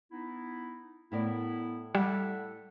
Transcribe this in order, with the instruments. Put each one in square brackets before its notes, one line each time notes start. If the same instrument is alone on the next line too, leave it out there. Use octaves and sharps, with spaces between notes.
[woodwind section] B3 D#4 E4
[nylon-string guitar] A2 A#4 D5 [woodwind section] B3 E4
[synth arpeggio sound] G3 [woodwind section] A4 E5 F#5